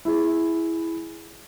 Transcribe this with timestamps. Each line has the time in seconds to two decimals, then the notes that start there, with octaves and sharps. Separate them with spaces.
0.05 E4 G#4